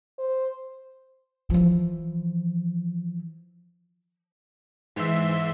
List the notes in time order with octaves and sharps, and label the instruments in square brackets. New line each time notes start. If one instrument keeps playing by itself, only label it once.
[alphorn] C5
[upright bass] E3 F3
[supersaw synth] G#2 E5 [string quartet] E3 C6